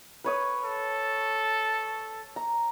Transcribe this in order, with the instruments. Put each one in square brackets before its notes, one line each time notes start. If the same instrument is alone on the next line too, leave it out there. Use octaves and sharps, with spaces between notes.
[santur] B4 C#5 D#6
[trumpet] A4
[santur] A#5